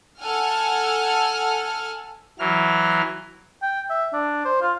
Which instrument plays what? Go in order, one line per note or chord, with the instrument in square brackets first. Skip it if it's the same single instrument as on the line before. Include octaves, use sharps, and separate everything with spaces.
[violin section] A4 F#5 G#5 F6
[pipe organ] E3 F#3 F6
[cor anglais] G5
E5
D4
C5
F4